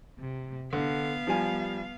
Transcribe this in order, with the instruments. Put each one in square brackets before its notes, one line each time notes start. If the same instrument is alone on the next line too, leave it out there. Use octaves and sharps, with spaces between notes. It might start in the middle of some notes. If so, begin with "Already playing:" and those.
[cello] C3
[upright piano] D3 [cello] B3 F5
[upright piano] F3 G3 G#5